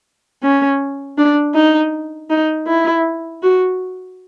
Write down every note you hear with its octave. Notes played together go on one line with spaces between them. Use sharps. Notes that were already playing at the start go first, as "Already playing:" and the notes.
C#4
D4
D#4
D#4
E4
F#4